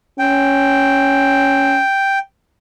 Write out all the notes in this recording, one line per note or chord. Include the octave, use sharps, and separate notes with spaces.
C#4 G5